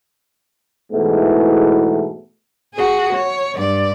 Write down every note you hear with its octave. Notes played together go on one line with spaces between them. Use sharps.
E2 G#2 B2 E3 A3
F#4 G#4
C#5
G2 D5